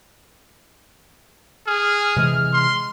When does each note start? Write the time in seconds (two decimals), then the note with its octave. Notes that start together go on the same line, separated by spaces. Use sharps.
1.67 G#4 F6
2.16 C3 E3 G#3
2.53 C6